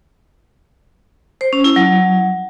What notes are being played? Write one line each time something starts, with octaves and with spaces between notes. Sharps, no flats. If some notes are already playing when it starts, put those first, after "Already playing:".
C5
C#4
E4
F#3